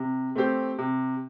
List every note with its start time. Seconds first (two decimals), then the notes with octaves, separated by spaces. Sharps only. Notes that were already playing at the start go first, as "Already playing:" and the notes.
Already playing: C3
0.35 A3 C4 G4 C5
0.78 C3